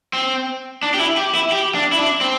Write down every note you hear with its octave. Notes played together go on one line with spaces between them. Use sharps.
C4
D4
G4
E4
G4
E4
G4
D4
E4
D4
C4